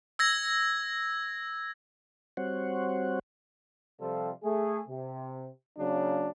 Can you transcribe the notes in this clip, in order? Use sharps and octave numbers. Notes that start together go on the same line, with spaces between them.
E6 G#6 A#6
G3 C4 F#4 C5 C#5 F#5
C3 F3 G3 F4 A4
A3 G#4
C3
C#3 F#3 A#3 C#4 D4